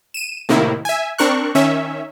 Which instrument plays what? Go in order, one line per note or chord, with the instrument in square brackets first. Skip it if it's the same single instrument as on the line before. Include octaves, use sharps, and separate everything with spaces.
[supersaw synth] D#7 E7
A2 C3 D#3 A#3 E4
E5 G#5
C4 D4 A#4 C#6 F#6
D#3 C#4 E5